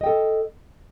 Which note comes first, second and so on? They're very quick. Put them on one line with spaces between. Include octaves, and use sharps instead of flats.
D#5 G5 A4